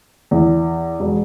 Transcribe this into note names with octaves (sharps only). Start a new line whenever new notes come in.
E2
E1